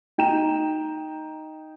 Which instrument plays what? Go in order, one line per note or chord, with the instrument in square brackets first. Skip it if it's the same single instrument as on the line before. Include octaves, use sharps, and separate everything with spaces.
[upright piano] D#4 G5 A#5 E7